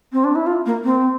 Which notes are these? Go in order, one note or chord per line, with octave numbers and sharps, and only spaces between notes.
C4
D4
E4
F4
A#3
C4